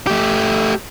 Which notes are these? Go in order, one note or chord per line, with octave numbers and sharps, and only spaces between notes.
A3 G4